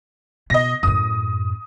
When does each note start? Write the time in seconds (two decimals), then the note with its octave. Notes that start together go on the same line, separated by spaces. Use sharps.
0.50 B2 B3 D#5 A#6
0.83 F#2 A2 D#6